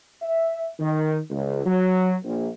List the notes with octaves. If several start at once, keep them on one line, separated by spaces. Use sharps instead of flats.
E5
D#3
C#2
F#3
A#1